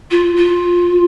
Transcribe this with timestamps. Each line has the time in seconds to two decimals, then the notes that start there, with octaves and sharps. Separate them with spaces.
0.10 F4
0.36 F4